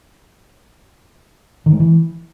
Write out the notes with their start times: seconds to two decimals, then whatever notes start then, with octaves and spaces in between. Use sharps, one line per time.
1.66 D#3
1.73 G#3
1.80 E3